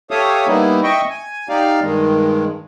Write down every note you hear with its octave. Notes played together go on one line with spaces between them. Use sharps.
G4 A4 C#5 E5 F5 D#6
G3 A#3 B3 D#4 E4
D#5 E5 G5 C#6
G#5
D#4 G4 D5 F5
G2 D#3 G#3